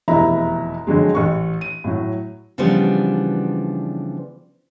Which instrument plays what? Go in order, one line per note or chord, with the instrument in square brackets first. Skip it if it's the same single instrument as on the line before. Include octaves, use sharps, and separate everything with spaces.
[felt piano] F1 E2 B2 E4 A#5 B5
F2 D3 F#3 G#3
A1 C#6
D#7
A2 F#3
[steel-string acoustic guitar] C#3 E3 F3 G3 B3 D4